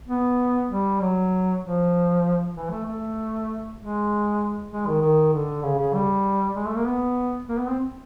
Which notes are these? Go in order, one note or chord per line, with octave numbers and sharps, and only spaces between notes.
B3
G3
F#3
F3
E3
A3
A3
G#3
G#3
D#3
D#3
D3
C#3
C#3
G3
G#3
A3
A#3
B3
A#3
B3
C4